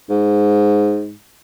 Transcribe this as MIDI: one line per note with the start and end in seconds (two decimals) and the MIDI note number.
0.10 1.13 44